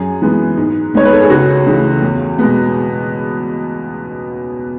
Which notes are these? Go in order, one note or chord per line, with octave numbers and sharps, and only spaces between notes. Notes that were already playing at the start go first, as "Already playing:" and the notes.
Already playing: F#2 G#4
E3 G#3 B3
G#2
D#3 G#3 B3 C#5
B4
A4
G#4
C#2 F#4
C#3 E3 A3
E2
B2 G#3 B3